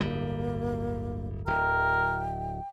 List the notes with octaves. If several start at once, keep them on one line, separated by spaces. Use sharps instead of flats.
D1 G1 G3 A#3
D1 A#4 G5